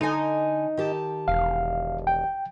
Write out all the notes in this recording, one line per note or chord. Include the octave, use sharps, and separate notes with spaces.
D3 D#4 G#5
D#3 G4 A5
E1 F5
G5